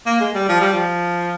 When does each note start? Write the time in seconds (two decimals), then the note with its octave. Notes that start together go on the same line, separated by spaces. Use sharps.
0.06 A#3
0.20 G#3
0.35 G3
0.49 F3
0.61 G3
0.73 F3